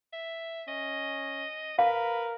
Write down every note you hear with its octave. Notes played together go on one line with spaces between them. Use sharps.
E5
C#4 D#5
A#4 B4 F5